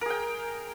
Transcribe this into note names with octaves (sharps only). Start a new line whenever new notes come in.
G#4 A#4 G5